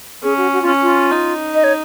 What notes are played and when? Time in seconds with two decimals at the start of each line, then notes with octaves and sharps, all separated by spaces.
0.23 C#4 G#4
0.37 F#4
0.53 F#4
0.62 C#4 F4
0.82 F4
1.11 D#4
1.55 D#5
1.64 C#5